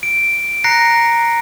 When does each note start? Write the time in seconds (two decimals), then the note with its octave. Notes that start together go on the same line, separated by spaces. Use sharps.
0.03 D7
0.64 A#5 F#6 A#6 C7 C#7